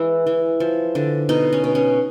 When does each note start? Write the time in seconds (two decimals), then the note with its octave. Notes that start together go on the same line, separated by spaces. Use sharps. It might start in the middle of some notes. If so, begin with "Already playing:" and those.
Already playing: E3 G#3 E4
0.27 E3
0.60 F3
0.95 D3
1.29 B2 D#4
1.53 C#4
1.64 B2
1.75 C#4